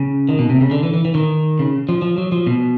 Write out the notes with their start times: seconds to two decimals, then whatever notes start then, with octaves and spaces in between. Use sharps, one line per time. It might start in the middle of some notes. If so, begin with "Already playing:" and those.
Already playing: C#3
0.29 D#3
0.39 B2
0.49 C3
0.61 C#3
0.71 D3
0.83 E3
0.94 E3
1.05 E3
1.15 D#3
1.59 C#3
1.89 F3
2.02 F3
2.18 F#3
2.32 F3
2.47 B2